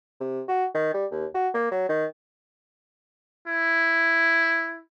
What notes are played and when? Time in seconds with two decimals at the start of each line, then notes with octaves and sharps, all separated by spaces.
0.21 C3
0.48 F#4
0.74 D#3
0.94 G3
1.12 D#2
1.35 F#4
1.54 A#3
1.72 F#3
1.89 D#3
3.47 E4